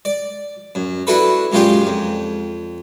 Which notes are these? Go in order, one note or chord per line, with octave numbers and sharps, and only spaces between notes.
D5
F#2
D4 E4 F#4 A4 B4
C#2 F#2 A#2 F4 G4 F5
F2